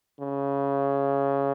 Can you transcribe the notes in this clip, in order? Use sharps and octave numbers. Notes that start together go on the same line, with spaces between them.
C#3